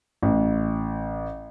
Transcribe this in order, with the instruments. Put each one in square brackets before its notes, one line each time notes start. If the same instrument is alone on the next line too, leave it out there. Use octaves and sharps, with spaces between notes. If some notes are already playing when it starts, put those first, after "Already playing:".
[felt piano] A1